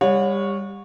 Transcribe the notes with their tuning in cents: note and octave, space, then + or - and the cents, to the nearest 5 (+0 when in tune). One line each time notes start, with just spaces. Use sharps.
G3 +30 C#5 -5 F#5 -35